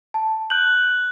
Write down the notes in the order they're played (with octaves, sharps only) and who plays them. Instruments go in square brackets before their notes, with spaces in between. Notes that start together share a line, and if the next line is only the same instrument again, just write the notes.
[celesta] A5
[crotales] F#6 F#7 [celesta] G6